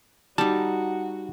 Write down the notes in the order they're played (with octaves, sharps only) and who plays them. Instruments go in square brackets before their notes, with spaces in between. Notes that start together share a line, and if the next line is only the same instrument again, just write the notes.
[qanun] G3 D#4 [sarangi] F#4 [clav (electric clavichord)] A5